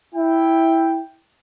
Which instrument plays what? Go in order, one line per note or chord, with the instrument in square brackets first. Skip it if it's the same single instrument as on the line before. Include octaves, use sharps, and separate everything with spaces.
[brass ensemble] E4 G5